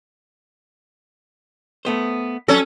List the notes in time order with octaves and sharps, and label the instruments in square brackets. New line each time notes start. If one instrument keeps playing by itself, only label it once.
[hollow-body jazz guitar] A3 B3 C5
[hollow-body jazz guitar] F#3 [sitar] C#4 A4